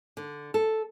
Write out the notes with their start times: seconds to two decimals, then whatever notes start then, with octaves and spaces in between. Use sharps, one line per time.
0.17 D3
0.54 A4